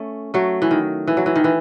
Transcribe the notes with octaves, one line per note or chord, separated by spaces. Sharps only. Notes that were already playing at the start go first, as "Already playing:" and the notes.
Already playing: A3 C#4
F#3 A3
E3
D#3
E3
F#3
E3
D#3
E3